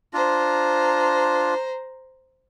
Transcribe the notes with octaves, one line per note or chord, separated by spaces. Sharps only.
D4 F4 C5 A#5